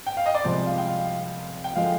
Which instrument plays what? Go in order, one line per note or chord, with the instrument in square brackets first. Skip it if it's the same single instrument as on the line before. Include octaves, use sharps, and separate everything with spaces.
[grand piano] G5
F5
D#5
D5
C2 C3 F3 G#3 C5
F5
G5
F5
G5
D3 F3 G#3 F5